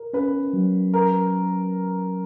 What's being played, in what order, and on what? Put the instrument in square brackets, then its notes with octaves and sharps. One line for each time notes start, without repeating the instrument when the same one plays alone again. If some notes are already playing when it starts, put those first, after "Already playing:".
Already playing: [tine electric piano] A#4
[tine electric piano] C#4 [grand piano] B4
[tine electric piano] F#3
[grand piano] A#4 [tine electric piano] B4